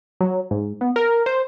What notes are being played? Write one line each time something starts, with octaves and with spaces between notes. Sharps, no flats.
F#3
G#2
B3
A#4
C5